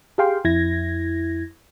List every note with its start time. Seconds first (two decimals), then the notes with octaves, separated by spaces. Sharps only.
0.18 G4 G#4 F5 G5 C6
0.44 F2 E4 G#6 A#6